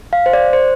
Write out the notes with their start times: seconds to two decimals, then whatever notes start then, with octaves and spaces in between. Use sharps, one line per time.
0.13 F5
0.26 C5
0.33 D5
0.53 C5